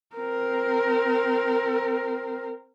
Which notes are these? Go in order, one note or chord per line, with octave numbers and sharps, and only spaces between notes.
C4 A#4